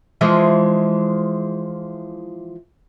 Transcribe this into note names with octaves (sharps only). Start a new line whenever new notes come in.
E3 F3 G#3